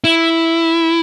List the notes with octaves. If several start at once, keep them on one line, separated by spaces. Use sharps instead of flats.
E4